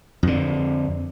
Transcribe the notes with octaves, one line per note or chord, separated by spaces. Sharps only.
F2 D3